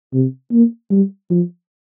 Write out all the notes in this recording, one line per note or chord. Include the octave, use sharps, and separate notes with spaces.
C3
A#3
G3
F3